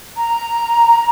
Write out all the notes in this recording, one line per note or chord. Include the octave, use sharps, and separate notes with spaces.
A#5